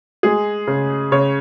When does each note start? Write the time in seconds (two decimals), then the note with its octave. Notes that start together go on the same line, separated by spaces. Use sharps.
0.23 G#3 G#4
0.67 C#3
1.12 C#3 C#5